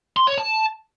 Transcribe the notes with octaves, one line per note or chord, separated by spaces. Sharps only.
C6
C#5
A5